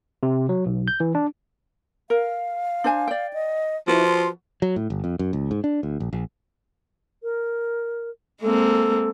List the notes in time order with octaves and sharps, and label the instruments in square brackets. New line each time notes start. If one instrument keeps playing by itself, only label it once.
[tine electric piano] C3
F#3
B1
G6
E3
D4
[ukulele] A#4 [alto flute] F5
[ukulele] D4 C5 G#5
D5 G5
[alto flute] D#5
[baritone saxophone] F3 [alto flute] E4 [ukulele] F#4 B4
[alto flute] C6
[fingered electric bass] F#3
A2
G1
F2
F#2
C#2
G#2
D4
D2
A#1
A#1
[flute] A#4
[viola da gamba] G#3 A#3 C4 [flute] A4